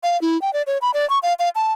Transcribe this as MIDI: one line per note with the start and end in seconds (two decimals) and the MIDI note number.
0.03 0.20 77
0.22 0.40 64
0.42 0.53 79
0.53 0.62 74
0.67 0.78 73
0.82 0.91 83
0.94 1.08 74
1.10 1.19 85
1.23 1.34 77
1.39 1.49 77
1.55 1.73 81